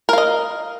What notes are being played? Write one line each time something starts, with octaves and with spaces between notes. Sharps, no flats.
A#4 D#5 F5